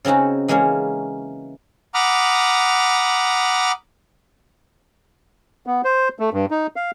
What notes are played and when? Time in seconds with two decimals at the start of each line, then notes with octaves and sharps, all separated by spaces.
0.05 C#3 C4 C#4 D#4 F#4
0.48 E3 G#3 A#3 C#4 C#5
1.94 F#5 A#5 B5 D6 D#6 F6
5.66 B3
5.84 C5
6.19 A3
6.33 G2
6.51 D#4
6.76 F5